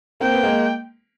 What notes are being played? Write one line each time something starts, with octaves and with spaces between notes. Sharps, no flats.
A#3 C4 G5
B3
G#3 A#3